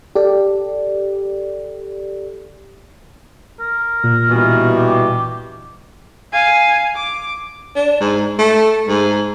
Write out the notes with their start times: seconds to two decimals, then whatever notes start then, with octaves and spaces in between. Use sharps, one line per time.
0.15 G4 A4 D5
3.60 A#4
4.04 A#2
4.29 G2 B2 E3
4.77 G4
6.32 F5 G#5
6.95 D6
7.75 D4
8.00 G#2
8.38 A3
8.88 G#2